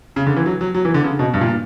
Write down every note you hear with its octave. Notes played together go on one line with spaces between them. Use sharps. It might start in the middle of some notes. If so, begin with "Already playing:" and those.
C#3
D3
E3
F#3
F#3
F#3
E3
D3
C#3
B2
G2
A#2